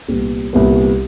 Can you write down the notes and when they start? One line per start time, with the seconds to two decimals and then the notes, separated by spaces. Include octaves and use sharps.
0.08 C2 A#2 G3 B3
0.53 C2 A#2 G3 B3